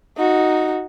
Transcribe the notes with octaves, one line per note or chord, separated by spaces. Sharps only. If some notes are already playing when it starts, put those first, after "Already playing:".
D#4 F#4